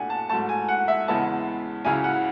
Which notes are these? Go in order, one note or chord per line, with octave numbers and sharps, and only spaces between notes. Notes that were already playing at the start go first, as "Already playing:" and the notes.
Already playing: C#2 B2 A3 D4 F#5 G#5
A5
G#2 F#3 A3 A5
G#5
F#5
E5
E2 C#3 G#3 B3 E4 A5
C#2 C#3 F#3 C#4 E4 G#5
F#5